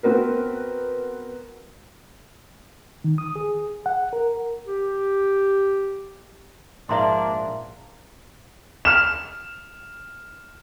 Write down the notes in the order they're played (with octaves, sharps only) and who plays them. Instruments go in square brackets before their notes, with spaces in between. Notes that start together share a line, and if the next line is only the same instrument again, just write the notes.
[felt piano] B3 C4 F#4 A#4 B4
[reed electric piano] D#3
D#6
G#4
F#5
A#4
[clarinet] G4
[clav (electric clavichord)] A#1 G#2 F4 [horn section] A#3 D4 [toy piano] E5 A#5 C6
[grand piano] F6 E7